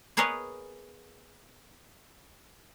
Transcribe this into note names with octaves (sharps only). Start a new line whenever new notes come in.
B3 G#4 A#4 B4 C#5 D#5